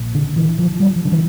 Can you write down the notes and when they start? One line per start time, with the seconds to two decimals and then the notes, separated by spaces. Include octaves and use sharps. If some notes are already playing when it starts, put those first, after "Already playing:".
Already playing: A#1 A#2
0.15 D3
0.36 E3
0.59 F3
0.80 G3
0.96 F3
1.05 D3
1.12 E3